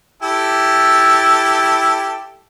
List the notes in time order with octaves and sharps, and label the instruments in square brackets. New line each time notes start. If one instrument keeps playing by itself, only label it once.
[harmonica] E4 G4 A4